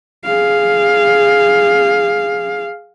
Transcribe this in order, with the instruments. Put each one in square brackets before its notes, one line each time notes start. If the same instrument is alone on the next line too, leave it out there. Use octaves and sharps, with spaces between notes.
[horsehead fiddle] G#4 F5